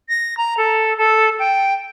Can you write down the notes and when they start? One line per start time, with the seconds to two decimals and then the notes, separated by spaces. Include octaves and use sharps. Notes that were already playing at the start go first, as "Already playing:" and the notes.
0.09 A#6
0.37 A#5
0.58 A4
0.97 A4
1.39 G5